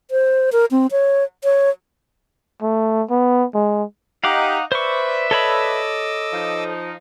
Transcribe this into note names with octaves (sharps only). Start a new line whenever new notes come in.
C5
A#4
C4
C#5
C#5
A3
B3
G#3
D#4 G4 F5 F#5 D6
B4 C5 D5 E5 B5 C#6
A4 C#5 D#5 B5 D6 E6
F3 D#4